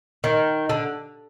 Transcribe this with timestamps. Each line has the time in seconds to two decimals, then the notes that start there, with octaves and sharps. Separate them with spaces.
0.24 D#3
0.69 D3